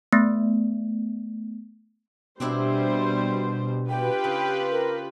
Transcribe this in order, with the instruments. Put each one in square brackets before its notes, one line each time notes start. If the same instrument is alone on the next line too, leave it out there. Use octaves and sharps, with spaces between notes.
[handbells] A3 B3
[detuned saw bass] B2 [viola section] G3 C5 [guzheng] C4 D4 E4
[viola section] F4 G4 B4 [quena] G5
[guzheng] C#3
[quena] A#4